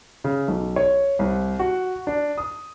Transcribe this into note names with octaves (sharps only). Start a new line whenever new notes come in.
C#3
B1
C#5
C2
F#4
D4
D#6